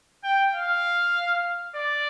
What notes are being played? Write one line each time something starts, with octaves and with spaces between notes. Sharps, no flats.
G5
F5
D5